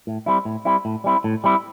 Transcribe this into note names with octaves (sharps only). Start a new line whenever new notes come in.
A2
G3 C4 E4
A2
G3 C4 E4
A2
G3 C4 E4
A2
G3 C4 E4